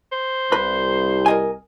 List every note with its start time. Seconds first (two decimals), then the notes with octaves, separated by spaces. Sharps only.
0.12 C5
0.52 C2 B4 B5
1.26 A#4 D#5 G#5